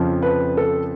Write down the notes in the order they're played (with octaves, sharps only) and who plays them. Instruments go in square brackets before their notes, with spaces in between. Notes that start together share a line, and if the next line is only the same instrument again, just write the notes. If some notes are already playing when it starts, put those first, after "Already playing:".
Already playing: [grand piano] F2 C#3 F3
B4
A4